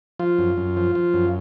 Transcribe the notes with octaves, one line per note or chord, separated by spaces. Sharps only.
F3 F4
F#2
F#2
F3
F3
F#2